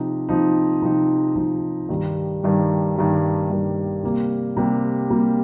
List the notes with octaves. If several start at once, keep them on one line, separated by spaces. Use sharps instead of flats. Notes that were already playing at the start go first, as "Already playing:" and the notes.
Already playing: C3 F3 D#4
C3 F3 D#4
C3 F3 D#4
C3 F3 D#4
G2 D#3 G3
G2 D#3 G3
G2 D#3 G3
G2 D#3 G3
C3 G3 A#3
C3 G3 A#3
C3 G3 A#3